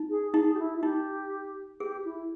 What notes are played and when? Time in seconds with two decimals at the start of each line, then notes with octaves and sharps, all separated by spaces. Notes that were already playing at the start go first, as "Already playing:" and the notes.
Already playing: D#4
0.10 G#4
0.34 D#4 G#4
0.54 G4
0.59 E4
0.78 E4
0.83 D#4 G4
1.80 G4 G#4
2.05 E4